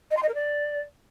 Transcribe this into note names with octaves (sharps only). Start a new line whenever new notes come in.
D#5
C6
D#5
A#4
D5